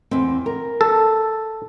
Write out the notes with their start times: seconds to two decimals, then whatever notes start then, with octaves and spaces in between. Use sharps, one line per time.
0.11 E2 C4
0.46 A#4
0.81 A4